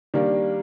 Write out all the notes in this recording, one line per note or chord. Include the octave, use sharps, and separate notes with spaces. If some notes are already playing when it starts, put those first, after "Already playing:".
D#3 G3 A#3 D4